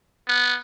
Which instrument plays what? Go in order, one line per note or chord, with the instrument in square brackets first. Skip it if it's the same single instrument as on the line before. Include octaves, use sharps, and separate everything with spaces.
[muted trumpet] B3